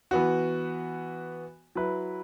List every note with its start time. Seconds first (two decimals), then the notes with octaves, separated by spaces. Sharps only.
0.11 E3 B3 F#4
1.75 F#3 E4 B4